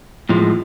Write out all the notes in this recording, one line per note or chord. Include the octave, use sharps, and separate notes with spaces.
A2 F3 G#3